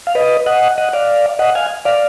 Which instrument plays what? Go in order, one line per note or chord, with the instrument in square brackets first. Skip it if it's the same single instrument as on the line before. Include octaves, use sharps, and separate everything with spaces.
[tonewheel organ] F5
B4 D#5
D#5 F#5
D#5 F#5
D5 F5
D#5 F#5
F5 G#5
D5 F5